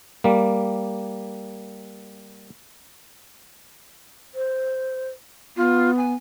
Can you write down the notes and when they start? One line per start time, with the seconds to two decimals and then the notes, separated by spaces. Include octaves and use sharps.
0.24 G3 A#3
4.35 C5
5.57 B3 F4
5.97 G#5